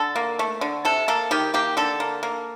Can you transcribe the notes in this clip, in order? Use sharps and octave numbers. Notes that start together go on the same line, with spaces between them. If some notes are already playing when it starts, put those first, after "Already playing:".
Already playing: D3 A4
A#3
A3
D3
C3 A4
A#3 A4
D#3 G4
A#3 G4
D3 A4
A#3
A#3